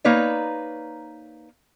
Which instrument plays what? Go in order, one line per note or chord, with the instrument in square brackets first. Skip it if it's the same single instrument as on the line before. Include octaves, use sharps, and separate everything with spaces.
[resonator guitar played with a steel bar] A#3 D#4 B4 C#5 D5